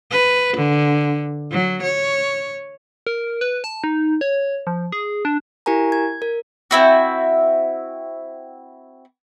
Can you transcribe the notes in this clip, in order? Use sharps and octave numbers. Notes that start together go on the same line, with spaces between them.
B4
D3
F#3
C#5
A#4
B4
A5
D#4
C#5
F3
G#4
D4
E4 G4 A#4 G#5 A#5
G#6
A#4
C4 E4 F#4